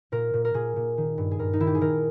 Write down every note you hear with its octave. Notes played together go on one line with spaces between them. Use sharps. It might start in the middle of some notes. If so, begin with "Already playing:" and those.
A#2 A#4
A#2
A#4
A#2 G#4
A#2
D#3
G2
G#4
G2 A#4
D#4
D#3 E4
G4
G#4
D#3 A#4